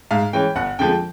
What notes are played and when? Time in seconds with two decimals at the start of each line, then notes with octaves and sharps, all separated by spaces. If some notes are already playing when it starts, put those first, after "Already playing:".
0.11 G#2 F5
0.33 E3 G#3 C#4 G5
0.55 G1 F#5
0.79 F2 D3 F3 G#3 G5